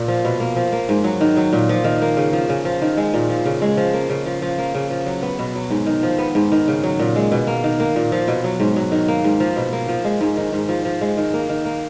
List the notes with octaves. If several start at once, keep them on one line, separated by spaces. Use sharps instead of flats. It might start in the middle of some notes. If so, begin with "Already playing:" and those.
Already playing: A#2
F3
B2
A#3
F3
A#3
G#2
F#3
D#3
F#3
A#2
F3
D#3
A#3
C#3
F3
C#3
F3
D#3
G#3
A#2
F3
C#3
G#3
F3
A#3
C#3
F3
F3
A#3
C#3
F3
F#3
B3
B2
F#3
G#2
D#3
F3
B3
G#2
D#3
C#3
F#3
A#2
G#3
B2
A#3
D#3
A#3
A#2
F3
B2
F#3
G#2
F#3
D#3
A#3
G#2
F3
B2
A#3
F3
G#3
G#2
D#3
G#2
F3
F3
G#3
D#3
A#3
D#3
A#3